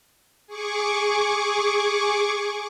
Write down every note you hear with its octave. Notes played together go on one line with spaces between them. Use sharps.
G#4 C#6 D6